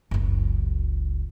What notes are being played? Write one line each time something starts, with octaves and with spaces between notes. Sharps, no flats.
F#1 C#2